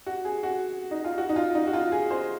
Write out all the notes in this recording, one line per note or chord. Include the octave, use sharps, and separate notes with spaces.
F#4
G#4
F#4
D#4
F4
F#4
D#4
F4
D#4
F#4
F4
G#4
C5